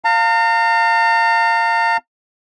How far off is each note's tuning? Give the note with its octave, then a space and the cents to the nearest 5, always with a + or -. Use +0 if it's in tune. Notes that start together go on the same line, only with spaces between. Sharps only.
F5 +5 A#5 -40